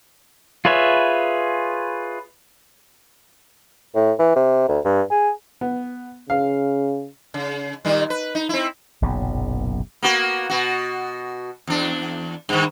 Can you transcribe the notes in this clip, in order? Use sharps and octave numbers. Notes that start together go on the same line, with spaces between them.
F4 G#4 B4 C#5 E5
A2
E3
C3
D2
G2
G#4
B3
C#3 F5
C#3
A#2 D#3 G3
B4
D#4
C4 E4
F#1 B1 A#2 C#3
A#3 B3 F#4
B2 F#4
E2 D4
G2 D#3